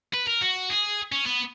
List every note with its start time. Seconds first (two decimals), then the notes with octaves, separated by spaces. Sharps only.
0.13 B4
0.27 A#4
0.41 F#4
0.70 G#4
1.12 C#4
1.26 B3